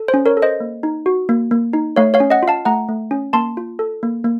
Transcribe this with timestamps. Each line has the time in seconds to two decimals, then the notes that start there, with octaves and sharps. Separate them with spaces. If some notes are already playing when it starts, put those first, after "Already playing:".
Already playing: A4
0.08 C5
0.14 C#4
0.26 A#4 C#5
0.37 A4
0.42 C5 D#5
0.60 A#3
0.83 D#4
1.06 F#4
1.29 A#3
1.51 A#3
1.73 D#4
1.96 A3 C#5 F5
2.14 C#5 F5
2.20 C#4
2.30 D#5 F#5
2.43 F4
2.48 F5 A5
2.65 A3 F#5 A#5
2.88 A3
3.11 C#4
3.33 A#3 A5 C6
3.57 F4
3.79 A4
4.03 A#3
4.24 A#3